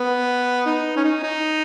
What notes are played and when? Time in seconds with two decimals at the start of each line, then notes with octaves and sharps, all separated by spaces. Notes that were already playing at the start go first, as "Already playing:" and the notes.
Already playing: B3
0.66 D#4
0.97 C#4
1.04 D#4
1.24 D#4